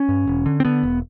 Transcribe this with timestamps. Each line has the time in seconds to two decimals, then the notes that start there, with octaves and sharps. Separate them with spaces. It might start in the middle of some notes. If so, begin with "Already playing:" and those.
Already playing: C#4
0.09 G2
0.27 E1
0.46 D3
0.60 C4
0.65 D3 B3
0.83 E1